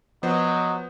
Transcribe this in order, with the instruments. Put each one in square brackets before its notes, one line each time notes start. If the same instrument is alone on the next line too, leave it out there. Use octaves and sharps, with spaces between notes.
[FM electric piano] F3 [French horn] F#3 [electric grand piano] B3 C5 [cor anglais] D#5